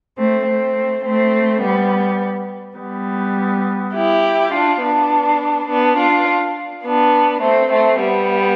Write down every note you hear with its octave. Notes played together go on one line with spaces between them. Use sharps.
A3 C4
A3 C4
A3 C4
G3 B3
G3 B3
E4 G4
D4 F4
B3 D4
B3 D4
D4 F4
B3 D4
A3 C4
A3 C4
G3 B3